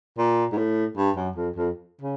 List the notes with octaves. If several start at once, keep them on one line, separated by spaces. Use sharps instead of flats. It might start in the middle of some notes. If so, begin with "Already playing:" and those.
A#2
G#2
A2
G2
F#2
F2
F2
C#3